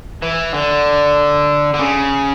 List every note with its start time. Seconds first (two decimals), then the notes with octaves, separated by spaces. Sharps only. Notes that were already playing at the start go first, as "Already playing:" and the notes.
0.22 E3
0.54 D3
1.74 D3
1.80 C#3